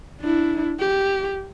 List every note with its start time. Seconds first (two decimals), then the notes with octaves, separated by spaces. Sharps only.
0.21 D4 E4
0.80 G4